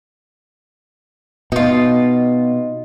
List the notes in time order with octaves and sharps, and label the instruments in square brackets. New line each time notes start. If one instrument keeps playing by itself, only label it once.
[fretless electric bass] B2 [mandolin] D#4 F4